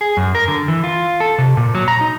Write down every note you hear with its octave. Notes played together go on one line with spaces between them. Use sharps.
G#4
F#2
A#4
D3
E3
F4
A4
C3
A#2
F#3
A#5
D#4